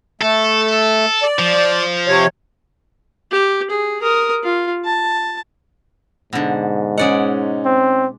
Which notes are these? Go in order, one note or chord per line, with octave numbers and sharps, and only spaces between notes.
A3 A4
D5
F3
C3 C#5
G4
G#4
A#4 D#6
F4
A5
G#2 B2 D3
G#3 C#4 D#4 D5 F#5
C4